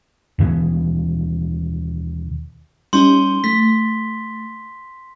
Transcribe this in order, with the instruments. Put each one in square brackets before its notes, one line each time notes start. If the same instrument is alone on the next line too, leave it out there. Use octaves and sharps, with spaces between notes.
[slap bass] D#2 B2 E3 B3
[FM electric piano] G3 C#4 D#4 [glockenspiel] C6 G7
[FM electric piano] A3 [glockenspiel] B6